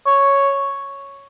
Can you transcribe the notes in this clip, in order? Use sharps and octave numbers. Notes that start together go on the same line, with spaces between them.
C#5